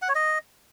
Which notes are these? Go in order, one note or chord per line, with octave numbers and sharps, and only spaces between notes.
F#5
C#5
D#5